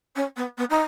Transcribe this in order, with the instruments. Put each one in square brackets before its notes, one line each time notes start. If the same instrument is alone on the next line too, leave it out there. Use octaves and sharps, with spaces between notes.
[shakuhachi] C#4
B3
B3
D#4